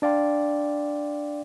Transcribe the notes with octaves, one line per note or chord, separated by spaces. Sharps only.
D4 D5 F5 G5 C6